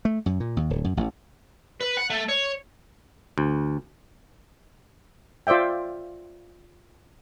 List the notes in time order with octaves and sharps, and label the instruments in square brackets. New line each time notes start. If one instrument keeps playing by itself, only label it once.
[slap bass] A3
F#2
A#2
D#2
D1
F#2
A1
[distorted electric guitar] B4
F#5
A3
C#5
[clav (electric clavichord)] D2
[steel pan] F4 C5 D5 E5 G5